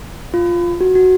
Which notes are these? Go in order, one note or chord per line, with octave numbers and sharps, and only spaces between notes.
F4
F#4
F#4